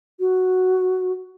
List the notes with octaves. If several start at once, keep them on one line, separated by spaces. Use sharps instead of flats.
F#4